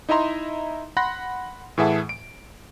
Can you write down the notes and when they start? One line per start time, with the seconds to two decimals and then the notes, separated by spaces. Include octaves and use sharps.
0.09 D#4 E4 D#5 E5 A#5 C6
0.97 F#5 B5 C6 F#6 A#6
1.78 A2 E3 G#4 E5 F#5 A5
2.09 D7